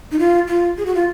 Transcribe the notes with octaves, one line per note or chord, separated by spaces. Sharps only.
D#4
F4
F4
G#4
F#4
F4